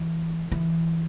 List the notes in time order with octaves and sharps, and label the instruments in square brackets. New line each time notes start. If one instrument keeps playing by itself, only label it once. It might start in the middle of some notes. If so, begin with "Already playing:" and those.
Already playing: [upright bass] E3
E3